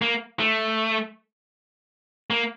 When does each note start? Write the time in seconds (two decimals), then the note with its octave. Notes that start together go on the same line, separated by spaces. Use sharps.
0.02 A#3
0.40 A3
2.30 A#3